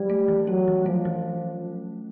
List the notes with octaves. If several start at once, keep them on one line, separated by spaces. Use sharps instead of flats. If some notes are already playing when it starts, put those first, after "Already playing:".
Already playing: F#3 G3
A3
E3
F#3 C#4
E3
F3 A3
E3